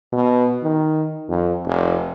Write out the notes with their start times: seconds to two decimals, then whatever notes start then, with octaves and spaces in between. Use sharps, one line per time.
0.12 B2
0.63 D#3
1.29 F2
1.66 F1